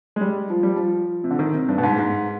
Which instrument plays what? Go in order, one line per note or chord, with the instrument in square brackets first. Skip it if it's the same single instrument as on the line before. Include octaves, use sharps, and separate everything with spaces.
[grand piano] G#3
G3
F3
G3
F3
C3
D3
D#3
C3
G2
B2
G#2
G#2